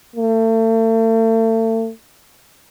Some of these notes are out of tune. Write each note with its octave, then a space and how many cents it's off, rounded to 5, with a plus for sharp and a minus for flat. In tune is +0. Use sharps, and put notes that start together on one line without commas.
A3 +40